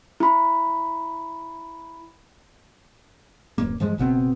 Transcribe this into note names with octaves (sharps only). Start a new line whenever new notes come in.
E4 B5
D1 F#2 A#3
G2 E3 F3 G#3
F#1 B2 B3 C4